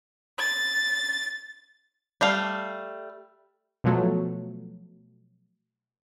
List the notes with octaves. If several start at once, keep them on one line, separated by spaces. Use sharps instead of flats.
A6
G3 A3 F5
B2 F3 F#3 A3